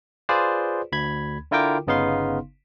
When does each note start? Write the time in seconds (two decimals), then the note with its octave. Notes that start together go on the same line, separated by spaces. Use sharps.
0.29 F4 G#4 B4 C5 D5
0.92 D2 B5 G#6
1.51 D3 E4 F4 A#4 G5 D6
1.87 G1 C#3 B3 D#4 F5 C6